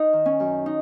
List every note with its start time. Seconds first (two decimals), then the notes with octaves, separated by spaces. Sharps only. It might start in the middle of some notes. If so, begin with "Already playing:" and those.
Already playing: D#4
0.13 D#3
0.26 C#4
0.40 F#2
0.66 D#4